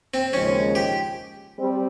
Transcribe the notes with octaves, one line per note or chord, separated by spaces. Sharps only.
C4
D#2 C#3 F3 G#3 C#4
G4
G3 C4